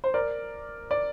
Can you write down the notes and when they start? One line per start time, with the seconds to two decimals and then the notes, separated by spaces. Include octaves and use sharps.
0.04 C5
0.14 A#4 D5
0.91 D5